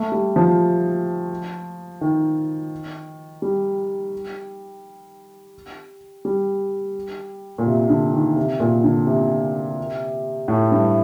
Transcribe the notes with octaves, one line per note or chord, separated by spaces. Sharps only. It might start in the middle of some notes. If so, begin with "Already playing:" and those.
Already playing: A3
G3
F3
D#3
G3
G3
A#2
C3
D3
D#3
C3
A#2
D3
C3
A2
G2